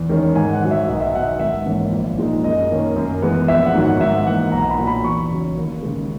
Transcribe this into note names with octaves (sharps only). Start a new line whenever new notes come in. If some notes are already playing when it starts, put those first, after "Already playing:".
Already playing: E2
D#3 G#3 C#4
G#2 G#5
F#5
D#3 F#3
E5
B1 D#5
E5
D#5
B2 F#3 F#5
E5
G#1 E5
G#2 E3 A#3 C#4
A#1
A#2 G#3 D#4
F#2 D#5
D#3 A#3 C#4
F#2
E3 G#3 B3
A#1 E5
F#5
G#2 D#3 F#3
F#5
G#2 E5
E3 A#3 F#5
B1 A#5
B5
A#2 F#3
B5
E2 C#6
C#3 F#3 C#4
D#2
C#3 G#3